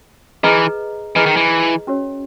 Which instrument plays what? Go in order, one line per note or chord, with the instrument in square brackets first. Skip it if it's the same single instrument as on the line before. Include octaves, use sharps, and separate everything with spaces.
[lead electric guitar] E3 [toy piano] G#4 B4 D#5 A#5
[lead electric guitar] E3 [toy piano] G#4 B4 D#5 A#5
[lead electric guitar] D#3
E3
[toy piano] C#4 F#4 C#5